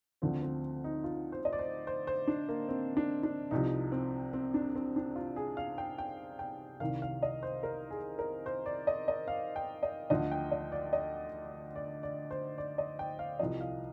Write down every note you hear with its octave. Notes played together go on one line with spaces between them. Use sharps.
D2 D3 F3 C4
C4
D#4
F4
C5
D#5
D5
C5
C5
C5
D4
A#3
C4
D4
D4
C2 C3 F3 D#4
C4
C4
D4
C4
D4
F4
G#4
F5
G5
G5
G5
C2 C3 D#3 F5
F5
D#5
C5
A#4
G#4
A#4
C5
D5
D#5
D#5
F5
G5
D#5
D2 D3 F3 D#5
G5
D#5
D5
D#5
D5
D5
C5
D5
D#5
G5
F5
C2 C3 F3 D#5
F5